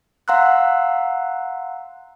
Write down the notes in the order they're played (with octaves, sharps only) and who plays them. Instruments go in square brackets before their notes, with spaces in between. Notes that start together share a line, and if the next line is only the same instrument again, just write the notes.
[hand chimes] F5 F#5 A#5 C6 E6 F#6